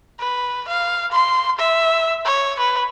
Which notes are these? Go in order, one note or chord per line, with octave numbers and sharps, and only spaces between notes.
B4
F5
C6
E5
C#5
B4